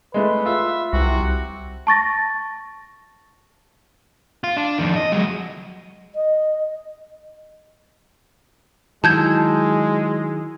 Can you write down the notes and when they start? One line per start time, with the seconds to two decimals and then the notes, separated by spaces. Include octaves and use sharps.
0.14 G#3 A3 B4
0.46 F4 E5
0.93 C2 C3 F#4
1.87 A5 C#6 A6 A#6
4.44 F4
4.57 D4
4.78 F2 D#3
4.96 D#5
5.12 F#3 G#3
6.15 D#5
9.04 D#3 F#3 G#3 E4 A5 E6 G6 G#6